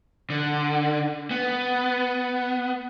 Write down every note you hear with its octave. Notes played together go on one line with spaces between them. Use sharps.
D3
B3